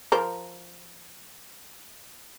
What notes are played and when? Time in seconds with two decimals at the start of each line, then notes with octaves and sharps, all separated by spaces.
0.12 F3 A#4 C5